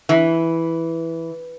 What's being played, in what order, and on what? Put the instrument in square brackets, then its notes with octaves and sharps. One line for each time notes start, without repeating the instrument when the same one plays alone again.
[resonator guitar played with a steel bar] E3